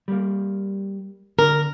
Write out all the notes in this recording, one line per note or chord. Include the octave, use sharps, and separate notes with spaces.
G3 A#3
D3 A#4